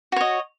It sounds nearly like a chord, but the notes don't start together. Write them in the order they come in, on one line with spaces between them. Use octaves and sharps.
F#4 C#5 D#5